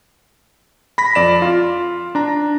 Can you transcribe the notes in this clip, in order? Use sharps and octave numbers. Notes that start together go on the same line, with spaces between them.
B5 A#6 B6
F2 D5 E7
F4
D4 A#5